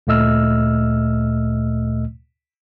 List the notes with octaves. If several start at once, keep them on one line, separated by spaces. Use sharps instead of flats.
D2 A#2 A3 D#5 E6 F6